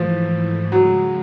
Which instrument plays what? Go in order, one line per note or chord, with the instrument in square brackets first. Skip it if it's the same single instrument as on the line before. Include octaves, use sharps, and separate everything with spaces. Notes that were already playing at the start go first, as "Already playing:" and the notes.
Already playing: [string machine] G#2 E3 A3 [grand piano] F3
[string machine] C#3 F3 G#3 [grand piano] F#3